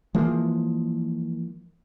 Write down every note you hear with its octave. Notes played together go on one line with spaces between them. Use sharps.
E3 F3 G#3 A#3